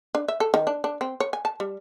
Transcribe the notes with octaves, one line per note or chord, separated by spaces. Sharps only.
D4
E5
A4
D#3
D4
D4
C4
C#5
G#5
A5
G3